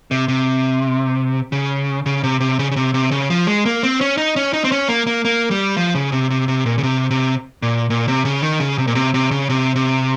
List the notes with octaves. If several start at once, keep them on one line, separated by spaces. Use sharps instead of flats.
C3
C3
C#3
C#3
C3
C3
C#3
C#3
C3
C3
C#3
F3
G#3
A#3
C4
C#4
D#4
C#4
D#4
C4
C#4
A#3
A#3
A#3
G3
F3
C#3
C3
C3
C3
A#2
C#3
C3
C3
A#2
A#2
C3
C#3
D#3
C#3
C3
A#2
C3
C3
C#3
C3
C3